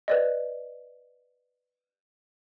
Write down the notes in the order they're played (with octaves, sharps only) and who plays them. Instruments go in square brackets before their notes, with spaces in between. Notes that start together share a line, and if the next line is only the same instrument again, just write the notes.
[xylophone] B4 D5 D#5